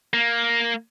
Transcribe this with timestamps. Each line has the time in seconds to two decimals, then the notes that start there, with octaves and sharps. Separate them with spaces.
0.14 A#3